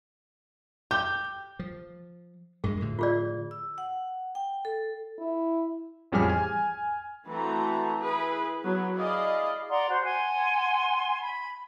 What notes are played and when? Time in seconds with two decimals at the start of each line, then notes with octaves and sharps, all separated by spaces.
0.91 G4 G6
1.59 F3
2.64 G2 G#3 G#4
2.81 A2 D3 F3
2.99 F4 G#4 D5
3.51 E6
3.78 F#5
4.35 G5
4.65 A4
5.19 E4
6.12 A1 F2 G3 G#4 G#5 F6
6.30 G#5
7.27 E3 A3 C4 F#4 A5 A#5
7.99 E4 G#4 B4
8.63 F#3 B3 B4
8.95 E4 G#4 D5 D#5 F5
9.69 D5 F#5 A#5 C6
9.90 F#4 C5
10.04 F#5 G#5 A5 C6
11.22 B5